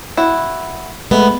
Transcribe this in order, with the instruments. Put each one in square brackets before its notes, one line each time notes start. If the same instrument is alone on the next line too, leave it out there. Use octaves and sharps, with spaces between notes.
[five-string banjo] E4 F#4
[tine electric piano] G#3 A3 [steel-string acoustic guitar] B3